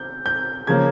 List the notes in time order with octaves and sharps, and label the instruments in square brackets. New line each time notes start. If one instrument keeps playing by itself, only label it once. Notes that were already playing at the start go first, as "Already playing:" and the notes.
Already playing: [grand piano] G6
G6
C#3 F3 A#3 C#4 G#6